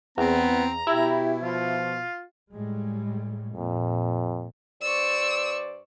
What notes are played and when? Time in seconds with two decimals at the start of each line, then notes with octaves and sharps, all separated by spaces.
0.18 E2 B3 C4 A#5
0.87 B2 E4 G4
1.42 F3 F4
2.52 A2 G3 G#3
3.53 F2 A#2
4.82 G2 C5 D5 C#6 E6